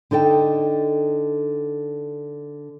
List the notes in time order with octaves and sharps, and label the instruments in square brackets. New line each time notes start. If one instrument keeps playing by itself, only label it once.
[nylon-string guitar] D3 D#4 A4 G5